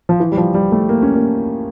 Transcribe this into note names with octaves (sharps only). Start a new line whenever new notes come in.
F3
E3
G3
F3
G3
A3
A#3
C#4
A#3